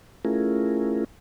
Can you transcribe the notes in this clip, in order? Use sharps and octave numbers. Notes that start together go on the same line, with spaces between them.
A3 C#4 E4 F4 G#4 A#4